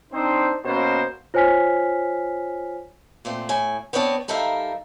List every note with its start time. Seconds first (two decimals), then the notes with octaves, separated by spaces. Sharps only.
0.13 C4 D4 D#4 C5
0.65 B2 A#3 C#4 C5
1.34 F4 C5 C#5 G#5 F6 B6
3.25 A#2 A3 C4
3.49 A2 G#5
3.93 B3 C4 D4 C#5 F#5 A5
4.28 G3 D#4 A4 A#4 E5 F5